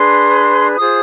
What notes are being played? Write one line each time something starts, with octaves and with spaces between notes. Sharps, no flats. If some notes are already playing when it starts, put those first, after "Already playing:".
Already playing: D4 G#4 B4 C6
F4 G#4 C5 D#6